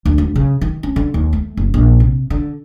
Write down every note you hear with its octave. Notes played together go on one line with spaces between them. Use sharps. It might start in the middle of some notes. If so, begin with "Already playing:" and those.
D2
D2
C#3
D#3
C#4
D3
D#2
A3
F#1
A#1
C3
D3